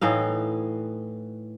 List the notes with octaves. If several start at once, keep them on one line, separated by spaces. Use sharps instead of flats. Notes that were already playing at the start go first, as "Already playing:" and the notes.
A2 E3 D#4 F5